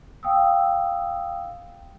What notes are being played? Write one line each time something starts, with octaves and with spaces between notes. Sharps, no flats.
F5 G5 D#6 E6